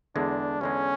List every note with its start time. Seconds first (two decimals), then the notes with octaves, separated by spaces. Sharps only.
0.16 E2 D3 G#3 D4
0.61 E2 D3 G#3 C#4